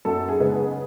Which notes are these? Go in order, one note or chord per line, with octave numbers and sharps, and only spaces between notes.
F#2 A4
G#4
C#3 G#3 B3
G#4